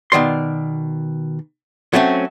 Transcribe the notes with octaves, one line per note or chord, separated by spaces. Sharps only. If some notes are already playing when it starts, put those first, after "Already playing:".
B2 D#3 D5 C6
F#3 A3 C4 C#4